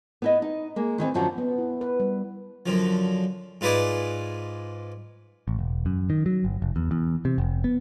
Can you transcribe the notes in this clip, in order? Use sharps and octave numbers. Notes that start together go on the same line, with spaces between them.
B3 E4 D#5
D#4
G#3 A#3
D#3 E3 G3 C4
F#2 D3 F3 C#4 F#4
B3
E4
B4
G3
F#2 D3 F3
G#2 F4 B4 D5 D#5 G#5
A1
E1
F#2
D#3
F#3
G1
F1
E2
E2
C3
F1
B3